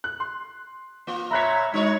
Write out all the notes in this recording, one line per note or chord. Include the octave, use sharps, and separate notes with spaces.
F#6
C6
A#3 F4
A#2 C#5 E5 A#5 B5 F#6 B6
G#3 D#4 F#4 C#5